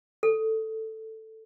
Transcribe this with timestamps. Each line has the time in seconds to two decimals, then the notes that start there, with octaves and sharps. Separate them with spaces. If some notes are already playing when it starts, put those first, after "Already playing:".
0.23 A4